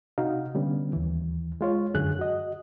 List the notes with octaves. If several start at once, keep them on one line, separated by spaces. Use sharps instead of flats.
C3 D#4 F#4 F5
D3 G3 B3 C#4
D#2 E3
G#3 F4 C#5
F#2 D3 G#4 F#6
F#4 D#5